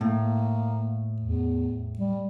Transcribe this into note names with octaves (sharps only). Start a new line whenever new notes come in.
A2 A#3
E2
G3